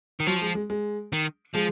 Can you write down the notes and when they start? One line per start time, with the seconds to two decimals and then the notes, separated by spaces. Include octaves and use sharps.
0.20 D#3
0.27 F3 F#3
0.41 G#3
0.55 G#3
0.70 G#3
1.13 D#3
1.55 F3 G#3